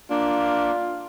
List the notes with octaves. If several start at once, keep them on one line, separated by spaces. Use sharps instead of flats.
A#3 D4 F4